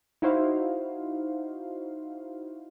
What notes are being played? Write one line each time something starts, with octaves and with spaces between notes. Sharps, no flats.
D#4 E4 F#4 C5 F5